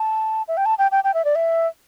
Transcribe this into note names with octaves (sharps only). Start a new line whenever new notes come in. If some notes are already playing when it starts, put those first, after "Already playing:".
Already playing: A5
E5
G5
A5
G5
G5
G5
E5
D5
E5